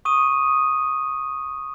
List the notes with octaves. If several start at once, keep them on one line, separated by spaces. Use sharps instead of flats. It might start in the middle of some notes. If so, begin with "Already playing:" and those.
C#6 D#6 D#7